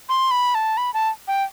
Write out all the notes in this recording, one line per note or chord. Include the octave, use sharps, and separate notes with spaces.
C6
B5
A5
B5
A5
G5